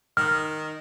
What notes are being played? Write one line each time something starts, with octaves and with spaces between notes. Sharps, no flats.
D#3 F6